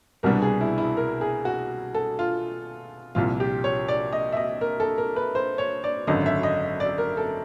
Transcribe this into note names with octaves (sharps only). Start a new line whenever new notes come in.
C2 B2 G3 B3 D4 A#4
G#4
E4
E4
A#4
G#4
F#4
A4
F4
C2 A#2 F3 F4
G4
C#5
D5
D#5
E5
D#5
A#4
A4
A#4
B4
C5
C#5
D5
G#1 F#2 D3 D#5
E5
D#5
D5
A#4
A4